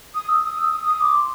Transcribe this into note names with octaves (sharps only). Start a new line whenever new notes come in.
D#6
E6
D#6
E6
D#6
D#6
D6
C6